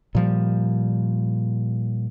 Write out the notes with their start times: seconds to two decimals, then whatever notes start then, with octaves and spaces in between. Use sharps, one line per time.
0.15 A#2 F3 G3